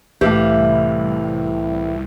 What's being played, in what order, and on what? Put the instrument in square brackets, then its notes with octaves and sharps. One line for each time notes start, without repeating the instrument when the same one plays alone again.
[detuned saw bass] C2 [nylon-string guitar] A2 E3 [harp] G4 F5